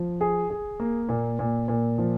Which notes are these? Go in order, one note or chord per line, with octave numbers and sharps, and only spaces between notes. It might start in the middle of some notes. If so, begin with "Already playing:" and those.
Already playing: F3
G#4
G#4
A#3
A#2
A#2
A#2
F3